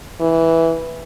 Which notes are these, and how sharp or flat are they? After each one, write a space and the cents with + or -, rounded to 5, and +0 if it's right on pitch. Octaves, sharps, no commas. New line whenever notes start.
E3 -5